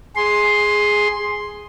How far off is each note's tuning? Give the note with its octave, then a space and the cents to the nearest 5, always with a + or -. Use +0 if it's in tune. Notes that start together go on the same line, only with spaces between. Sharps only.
G#4 +0 C6 +5